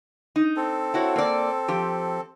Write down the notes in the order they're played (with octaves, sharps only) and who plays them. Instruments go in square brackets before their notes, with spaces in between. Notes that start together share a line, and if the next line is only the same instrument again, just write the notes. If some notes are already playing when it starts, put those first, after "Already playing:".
[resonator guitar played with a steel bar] D#4
[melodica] C4 A4
[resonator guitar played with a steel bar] E4 F#4 C#5
A#3 D5
F3 G4